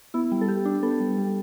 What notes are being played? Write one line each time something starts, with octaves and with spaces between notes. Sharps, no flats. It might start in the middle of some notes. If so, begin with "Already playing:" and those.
B3 E4
G3
A4
G3 G4
D4
B3 A4
G3
G3